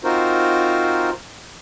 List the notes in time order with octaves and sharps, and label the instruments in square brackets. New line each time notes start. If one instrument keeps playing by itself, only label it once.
[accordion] C4 D#4 F4 F#4 A#4 C5